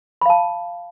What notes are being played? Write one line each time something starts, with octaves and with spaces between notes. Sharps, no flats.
F5 A5 B5